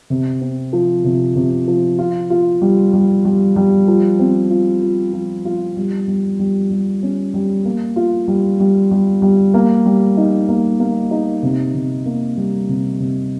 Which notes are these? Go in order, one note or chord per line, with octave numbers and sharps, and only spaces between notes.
C3
C4
F3
C3
C3
F3
F4
F4
G3
G3
G3
G3
F3
C4
F4
F3
F3
F4
G3
G3
G3
G3
C#4
G3
A#3
F4
G3
G3
G3
G3
A#3
G3
D#4
A#3
A#3
D#4
C3
C3
A#3
G3
C3
C3